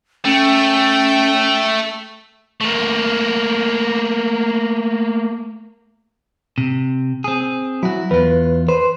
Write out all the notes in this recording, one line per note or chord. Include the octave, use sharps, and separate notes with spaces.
A3 C#4 G5
A3 A#3
C3
C4 G#4
F#3 E4 F#4
E2 F4 B4
B4 C5